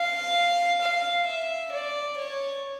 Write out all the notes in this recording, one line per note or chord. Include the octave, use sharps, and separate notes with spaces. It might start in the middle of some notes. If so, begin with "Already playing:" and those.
Already playing: F5
F5
E5
D5
C#5